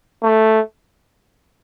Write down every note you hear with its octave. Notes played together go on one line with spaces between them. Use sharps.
A3